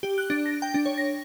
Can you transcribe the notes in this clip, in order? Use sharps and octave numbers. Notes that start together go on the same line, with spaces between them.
G4
F#6
D4
A#6
G5
D4
C#5
A#6